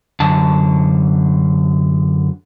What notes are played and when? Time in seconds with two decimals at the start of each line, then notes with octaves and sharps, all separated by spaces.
0.20 F#2 D3 A5